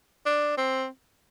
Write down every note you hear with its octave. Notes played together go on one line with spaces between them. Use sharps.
D4
C4